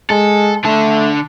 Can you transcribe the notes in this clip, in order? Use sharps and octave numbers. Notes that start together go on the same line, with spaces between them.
G#3 A4
D3 A3 A5